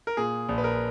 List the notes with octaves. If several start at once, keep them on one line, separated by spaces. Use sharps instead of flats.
A#4
A#2 G#4
A#1
B4
A#4